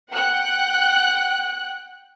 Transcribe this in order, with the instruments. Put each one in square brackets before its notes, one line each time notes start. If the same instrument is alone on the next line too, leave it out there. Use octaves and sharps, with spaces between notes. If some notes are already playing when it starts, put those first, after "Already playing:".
[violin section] F#5 G5 F#6